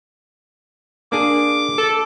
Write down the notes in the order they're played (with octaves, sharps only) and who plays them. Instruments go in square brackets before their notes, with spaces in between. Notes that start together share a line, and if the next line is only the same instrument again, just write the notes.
[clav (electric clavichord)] A#3 D4 G#4 [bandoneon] D6
[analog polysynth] A4